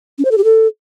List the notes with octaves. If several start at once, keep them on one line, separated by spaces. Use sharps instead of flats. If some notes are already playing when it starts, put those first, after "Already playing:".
C#4
C5
A4
G4
A4